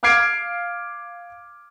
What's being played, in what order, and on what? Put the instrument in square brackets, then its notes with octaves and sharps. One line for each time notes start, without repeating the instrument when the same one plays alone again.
[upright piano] F5 D6 F6 G#6 C7 D7